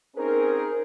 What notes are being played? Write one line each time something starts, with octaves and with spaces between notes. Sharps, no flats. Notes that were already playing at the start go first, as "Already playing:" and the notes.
C4 C#4 D#4 G#4 A#4